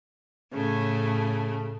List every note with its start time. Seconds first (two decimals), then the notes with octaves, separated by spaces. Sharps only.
0.53 A2 C#3 A3